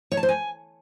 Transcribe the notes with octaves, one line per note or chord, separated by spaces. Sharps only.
C#5
A5
C5
G#5